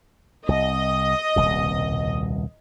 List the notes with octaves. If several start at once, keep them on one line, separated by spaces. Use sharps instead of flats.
C2 D#5
D#1 C2 B2